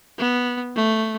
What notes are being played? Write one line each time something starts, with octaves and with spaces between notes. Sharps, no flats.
B3
A3